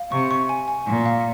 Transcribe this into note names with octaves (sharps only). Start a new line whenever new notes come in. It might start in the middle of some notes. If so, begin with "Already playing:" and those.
Already playing: F5
C3 C#6
C#6
G#5
G#5
A#2 G#5
F5